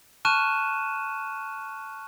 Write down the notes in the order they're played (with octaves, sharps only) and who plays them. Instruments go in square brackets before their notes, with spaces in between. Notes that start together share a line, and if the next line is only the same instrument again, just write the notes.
[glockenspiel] A5 C#6 F6 F#6 D#7 E7